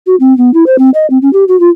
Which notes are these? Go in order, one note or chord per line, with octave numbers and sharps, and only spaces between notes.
F#4
C4
B3
E4
C5
C4
D#5
C4
C#4
G4
F#4
F4